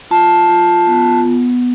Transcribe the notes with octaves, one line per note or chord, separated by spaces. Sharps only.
F4 A5
F4
B3
B3